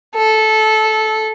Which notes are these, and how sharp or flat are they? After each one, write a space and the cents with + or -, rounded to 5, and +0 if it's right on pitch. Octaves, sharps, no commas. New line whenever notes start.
A4 -15